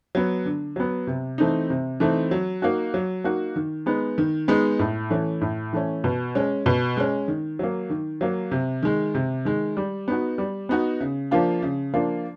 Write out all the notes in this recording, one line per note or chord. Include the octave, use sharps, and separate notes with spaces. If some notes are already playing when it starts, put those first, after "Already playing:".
F#3 B3
D3
F#3 B3
C3
E3 A3 C4 D#4
C3
E3 A3 C4 D#4
F#3
A#3 D#4 F#4
F#3
A#3 D#4 F#4
D#3
G#3 B3 D#4
D#3
G#3 B3 D#4
A2
E3 A3 C#4
A2
E3 A3 C#4
B2
G#3 C#4
B2
G#3 C#4
D#3
F#3 A#3
D#3
F#3 A#3
C3
D#3 G#3
C3
D#3 G#3
G3
B3 D#4 F#4
G3
B3 D#4 F#4
C#3
F3 A#3 D4 F4
C#3
F3 A#3 D4 F4